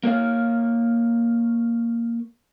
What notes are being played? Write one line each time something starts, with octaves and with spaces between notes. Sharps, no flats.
A#3 A#4 C#5 F5